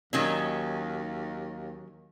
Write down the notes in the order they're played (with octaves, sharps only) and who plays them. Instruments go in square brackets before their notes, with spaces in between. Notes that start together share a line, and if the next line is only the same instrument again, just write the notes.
[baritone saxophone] D#2 [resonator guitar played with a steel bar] D#3 F#3 C#4